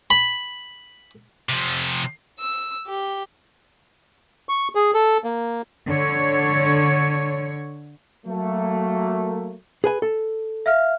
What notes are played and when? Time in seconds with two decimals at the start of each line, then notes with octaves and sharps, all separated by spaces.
0.10 B5
1.49 C3 F3
2.40 E6
2.88 G4
4.49 C#6
4.75 G#4
4.94 A4
5.24 A#3
5.86 D3 C#5
8.27 F#3 A3 A#3
9.84 G#4 B4 G#5
10.02 A4
10.66 E5 F5 F6